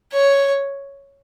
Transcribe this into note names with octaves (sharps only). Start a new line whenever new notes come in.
C#5